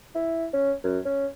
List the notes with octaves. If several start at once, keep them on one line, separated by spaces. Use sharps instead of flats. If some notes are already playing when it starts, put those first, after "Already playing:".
E4
C#4
F#2
C#4